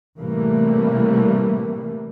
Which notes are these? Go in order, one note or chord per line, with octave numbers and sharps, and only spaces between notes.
A2 C3 E3 G3 A3 A#3